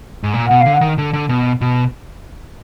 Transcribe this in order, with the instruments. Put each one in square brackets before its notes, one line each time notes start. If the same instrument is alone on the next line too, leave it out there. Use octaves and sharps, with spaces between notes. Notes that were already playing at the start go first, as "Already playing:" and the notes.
[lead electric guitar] G#2
A#2
[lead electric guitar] B2 [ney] F#5
[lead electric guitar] D3 [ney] F5
[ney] F#5
[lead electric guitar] D#3
D3
D3
B2
B2